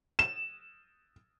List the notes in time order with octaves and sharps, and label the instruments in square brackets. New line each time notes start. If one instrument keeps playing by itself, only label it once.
[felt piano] E7